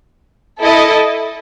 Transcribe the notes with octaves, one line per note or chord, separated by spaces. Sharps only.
E4 A4 D#5